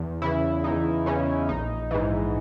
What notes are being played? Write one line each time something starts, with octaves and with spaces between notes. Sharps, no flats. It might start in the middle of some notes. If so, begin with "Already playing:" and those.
Already playing: E2
C#3 E3 E4
E2 D#4
C#3 E3 C#4
A#1 D#4
G#2 E3